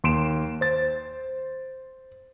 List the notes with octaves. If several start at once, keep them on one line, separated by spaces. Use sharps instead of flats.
D#2 C6 D7 E7
C5 A6